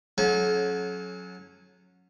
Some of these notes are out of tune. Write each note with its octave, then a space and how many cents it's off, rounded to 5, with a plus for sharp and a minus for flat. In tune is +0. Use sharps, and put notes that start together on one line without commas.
F#3 -25 C#4 -10 A4 -45